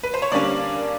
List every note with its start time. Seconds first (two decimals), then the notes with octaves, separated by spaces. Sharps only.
0.03 B4
0.14 C5
0.22 C#5
0.32 D3 G3 A#3 C#4 D4 D5